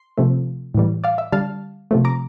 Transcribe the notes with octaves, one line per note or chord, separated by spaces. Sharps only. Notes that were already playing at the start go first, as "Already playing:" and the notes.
Already playing: C6
C3 F3 A3
A2 E3 G3
D5 F5
E5
D3 G3 F5 A5
C3 F3 A3
A#5 D6